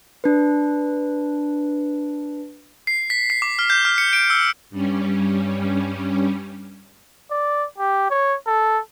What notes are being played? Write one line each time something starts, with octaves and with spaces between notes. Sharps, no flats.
D4 B4
C7
B6
C7
D6
F6
G6
F6
C#7
D7
E6
G2 G3 C#4
D5
G4
C#5
A4